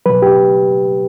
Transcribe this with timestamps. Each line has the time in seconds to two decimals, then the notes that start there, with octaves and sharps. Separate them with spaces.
0.06 B2 F#3 B4
0.22 G4